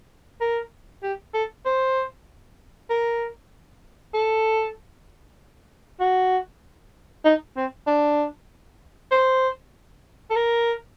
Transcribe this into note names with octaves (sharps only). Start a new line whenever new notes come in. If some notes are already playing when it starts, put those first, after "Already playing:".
A#4
G4
A4
C5
A#4
A4
F#4
D#4
C4
D4
C5
A4
A#4